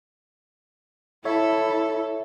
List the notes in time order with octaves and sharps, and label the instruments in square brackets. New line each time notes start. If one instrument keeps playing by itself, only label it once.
[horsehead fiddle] E4 [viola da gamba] A4 [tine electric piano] C#5 E5